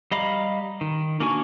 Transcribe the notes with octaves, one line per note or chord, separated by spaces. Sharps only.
G3 D#5 F5 A#5 B5
D#3
A#3 D4 F#4 G#5 C#6